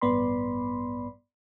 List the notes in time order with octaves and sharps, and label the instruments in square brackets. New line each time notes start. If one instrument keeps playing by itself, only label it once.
[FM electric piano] A1 G2 B3 D5 B5 C6